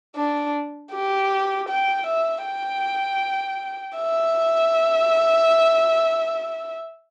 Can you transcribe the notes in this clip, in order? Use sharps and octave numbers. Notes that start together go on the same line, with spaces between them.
D4
G4
G5
E5
G5
E5